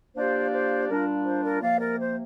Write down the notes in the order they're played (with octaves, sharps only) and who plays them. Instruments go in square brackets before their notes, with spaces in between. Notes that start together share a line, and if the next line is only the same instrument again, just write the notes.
[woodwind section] F3 A#3 D4 G4 D5 [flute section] C5
[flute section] C5
[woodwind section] A#2 G3 D4 F4 [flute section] A#4
[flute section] C5
A#4 D5
[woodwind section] C3 F3 A#3 [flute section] D5 F5
[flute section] A#4 D5
C5